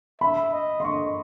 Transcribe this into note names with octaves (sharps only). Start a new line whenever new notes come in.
E5 B5
D#5
C6
D#5 C#6